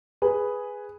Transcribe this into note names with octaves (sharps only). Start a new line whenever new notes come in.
G#4 B4